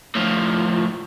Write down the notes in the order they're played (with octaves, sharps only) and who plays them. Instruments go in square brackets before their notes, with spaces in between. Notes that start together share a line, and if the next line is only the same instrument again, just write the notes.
[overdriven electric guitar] A2 F3